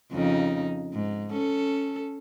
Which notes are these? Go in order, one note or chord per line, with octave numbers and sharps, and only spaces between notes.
F2 C#3 D#4
G#2
C#4 A4